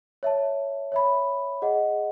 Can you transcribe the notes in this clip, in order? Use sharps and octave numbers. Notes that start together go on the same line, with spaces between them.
C#5 E5 A5
C#5 E5 B5
G#4 D#5 F#5